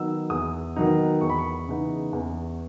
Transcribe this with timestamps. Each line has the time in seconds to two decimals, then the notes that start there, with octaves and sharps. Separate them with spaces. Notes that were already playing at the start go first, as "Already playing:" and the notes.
Already playing: D#3 F#3 B3 D#4 E6
0.30 E2 D#6
0.76 D#3 F#3 B3 D#4
1.21 E2 C#6
1.30 B5
1.38 C#6
1.67 C#3 E3 B3 D#4
2.13 E2